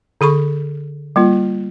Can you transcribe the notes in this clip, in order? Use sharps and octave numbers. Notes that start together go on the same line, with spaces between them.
D3 G#4 B5 C#6
G3 A#3 F4